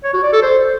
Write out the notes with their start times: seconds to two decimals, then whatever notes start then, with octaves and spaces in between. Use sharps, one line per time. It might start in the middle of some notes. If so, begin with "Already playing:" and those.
0.04 C#5
0.13 F#4
0.23 D5
0.33 A4
0.42 C5